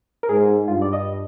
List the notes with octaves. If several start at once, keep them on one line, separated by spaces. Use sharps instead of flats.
A#4
G#2 G#4
G2 F4
D5
D#5